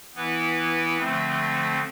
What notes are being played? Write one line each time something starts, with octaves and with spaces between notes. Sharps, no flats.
E3 B3 E4 B4
D3 F3 A3 C4